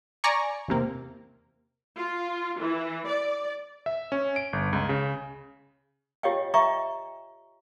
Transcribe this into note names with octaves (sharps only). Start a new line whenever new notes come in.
D5 G#5 A#5 C#6
E2 C3 A#3
F4
E3
D5
E5
C#4
D7
G1
C#2
C#3
F4 G4 C#5 D#5 F5 G5
D#5 E5 G5 A#5 C#6